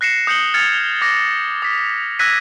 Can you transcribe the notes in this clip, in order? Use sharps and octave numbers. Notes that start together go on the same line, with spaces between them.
F#6 A#6 C7 C#7 E7
D#6 G6 C#7 F#7 G7
F6 G#6 A6 C#7 F7
D6 A#6
D#6 B6
E6 F#6 G#6 A#6 B6 D#7